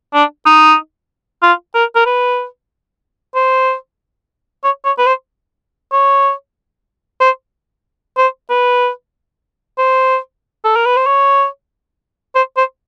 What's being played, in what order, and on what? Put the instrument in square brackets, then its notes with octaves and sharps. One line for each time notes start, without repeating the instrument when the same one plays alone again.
[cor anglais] D4
D#4
F4
A#4
A#4
B4
C5
C#5
C#5
B4
C5
C#5
C5
C5
B4
C5
A4
A#4
B4
C5
C#5
C5
C5